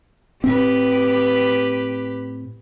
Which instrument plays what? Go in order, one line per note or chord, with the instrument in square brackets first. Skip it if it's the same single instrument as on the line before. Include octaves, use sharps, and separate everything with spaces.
[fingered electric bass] A2 C4 [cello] G4 B4